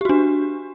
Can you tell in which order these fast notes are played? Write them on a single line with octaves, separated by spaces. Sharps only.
G4 F#4 D4